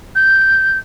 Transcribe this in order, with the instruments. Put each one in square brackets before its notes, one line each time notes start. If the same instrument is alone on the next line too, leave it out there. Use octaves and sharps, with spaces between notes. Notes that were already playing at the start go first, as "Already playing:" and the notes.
[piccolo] G6